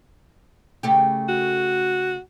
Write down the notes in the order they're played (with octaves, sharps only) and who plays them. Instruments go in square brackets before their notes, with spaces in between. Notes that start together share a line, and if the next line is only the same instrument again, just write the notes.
[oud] C#3 A3 G4
[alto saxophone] F#4